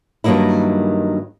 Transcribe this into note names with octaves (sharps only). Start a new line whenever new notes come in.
G2 D#3 F#3 A#3 D#4 E4